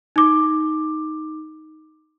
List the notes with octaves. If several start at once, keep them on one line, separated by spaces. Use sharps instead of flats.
D#4 D6